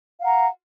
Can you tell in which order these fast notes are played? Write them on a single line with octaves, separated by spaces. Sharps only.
F5 F#5 A#5